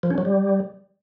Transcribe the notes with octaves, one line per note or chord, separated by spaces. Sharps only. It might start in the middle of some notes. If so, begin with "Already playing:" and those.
F3
C#4
F#3
G3